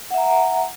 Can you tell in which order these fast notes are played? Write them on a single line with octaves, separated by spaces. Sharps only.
F#5 E5 A#5